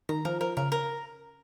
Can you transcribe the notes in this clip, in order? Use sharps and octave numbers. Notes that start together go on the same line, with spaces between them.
D#3 A#5
F3 A#4
F3 A#4
C#3 A#4
A#4